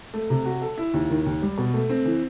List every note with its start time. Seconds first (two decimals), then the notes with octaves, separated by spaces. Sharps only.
0.14 A3
0.30 C3
0.45 F#4
0.61 A4
0.78 E4
0.94 D#2
1.10 D#3
1.26 D#2
1.42 G3
1.58 B2
1.74 A3
1.90 C4
2.05 E3